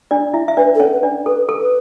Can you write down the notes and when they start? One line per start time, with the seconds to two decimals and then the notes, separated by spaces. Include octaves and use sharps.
0.11 D4 D5
0.34 E4 E5
0.48 E5
0.56 D4 B4 D5
0.74 A4
0.80 C#4 C#5
0.91 B4
1.03 D4 D5
1.26 A4 B4
1.49 A4
1.60 B4